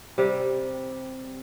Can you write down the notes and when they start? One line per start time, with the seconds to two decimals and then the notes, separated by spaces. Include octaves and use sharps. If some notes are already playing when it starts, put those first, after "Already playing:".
0.18 C3 G3 G4